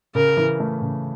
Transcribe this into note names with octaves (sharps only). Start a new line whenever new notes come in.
C#3 A#4
E3
A3
C#3